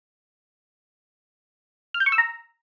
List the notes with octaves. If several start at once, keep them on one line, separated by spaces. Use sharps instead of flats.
F6
G6
C#6
E6
A#5